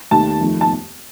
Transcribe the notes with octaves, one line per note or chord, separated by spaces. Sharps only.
D#2 D#3 A3 A5
F2 D#3 A3
A5